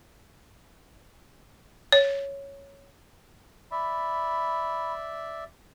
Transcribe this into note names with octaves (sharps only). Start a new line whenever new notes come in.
C#5
D5 E5 B5